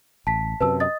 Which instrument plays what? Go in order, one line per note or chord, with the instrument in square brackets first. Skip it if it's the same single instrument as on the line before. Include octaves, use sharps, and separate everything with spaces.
[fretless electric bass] A1 [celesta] A5 B6
[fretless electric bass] F#2 C3 [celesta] B4 A5 E6
[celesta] D#5 D#6 A6